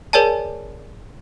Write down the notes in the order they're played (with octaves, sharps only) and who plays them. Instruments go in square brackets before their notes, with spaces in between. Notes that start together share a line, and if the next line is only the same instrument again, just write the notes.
[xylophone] G#4 A#4 C#5 D5 G#5 A5